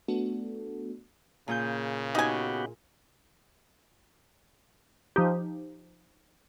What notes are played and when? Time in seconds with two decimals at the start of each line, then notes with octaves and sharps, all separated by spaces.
0.08 A3 B3 D4 F#4 A4
1.48 A#2 C#3 G#4 G6
2.15 B3 D#4 F#4 G4 G#5
5.16 F3 D#4 G4